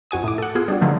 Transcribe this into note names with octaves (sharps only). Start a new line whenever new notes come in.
F2 F#4 G#5 D#6
A2 D6
A4 F#5
B3 F4 G#4
G3 D4 F#4
D3 D#3 F3 F#3 A3